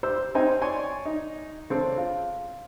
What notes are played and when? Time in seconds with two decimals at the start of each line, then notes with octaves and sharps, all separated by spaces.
0.03 G4 C5 E6
0.35 C4 C#4 D#4 C5 G5 G#5
0.61 C#5 D5 G#5 C6
1.05 D#4
1.70 C#3 C4 D4 A4
1.98 F4